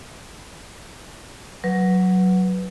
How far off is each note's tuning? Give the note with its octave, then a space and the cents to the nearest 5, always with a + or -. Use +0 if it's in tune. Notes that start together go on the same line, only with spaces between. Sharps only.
F#3 +0 B4 +0